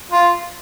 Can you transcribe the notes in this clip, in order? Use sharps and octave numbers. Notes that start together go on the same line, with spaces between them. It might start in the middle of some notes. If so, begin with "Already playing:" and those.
F4